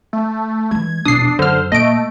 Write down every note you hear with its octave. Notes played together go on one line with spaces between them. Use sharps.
A3
E3 G#3 G#6
E1 A#1 D4 D#6 C7
F#2 D3 C5 F6
A#2 A3 D#5 D7